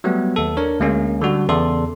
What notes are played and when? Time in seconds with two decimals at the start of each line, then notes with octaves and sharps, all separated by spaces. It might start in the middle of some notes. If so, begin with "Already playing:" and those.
0.04 F#3 G3 A3 B3 G4
0.36 D#2 A4
0.57 D4 A#4 C#5
0.80 D2 G#3 A#3 C#4
1.21 D3 G3 F#4
1.49 E2 C#3 A4 D5 C6